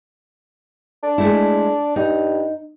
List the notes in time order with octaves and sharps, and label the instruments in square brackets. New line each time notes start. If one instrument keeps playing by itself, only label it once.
[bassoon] D4
[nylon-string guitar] G#3 A3 E4
[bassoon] G2 [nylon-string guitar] D#4